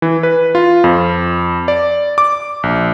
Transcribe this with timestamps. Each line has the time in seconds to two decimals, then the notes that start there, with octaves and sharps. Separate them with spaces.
0.02 E3
0.23 B4
0.55 F4
0.84 F2
1.68 D5
2.18 D6
2.63 A#1